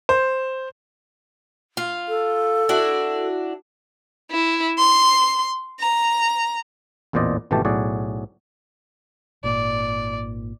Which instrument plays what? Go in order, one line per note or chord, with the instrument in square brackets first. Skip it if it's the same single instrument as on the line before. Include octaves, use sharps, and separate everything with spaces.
[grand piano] C5
[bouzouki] F4
[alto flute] A4
[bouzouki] D4 E4 F#4
[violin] E4
C6
A#5
[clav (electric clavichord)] A1 E2 A#2 C5 D5 D#5
G#1 B2 E3 A3 G4 A5
B1 A2 F#4 G#4 D5
[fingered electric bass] G#1 A#2 [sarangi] D5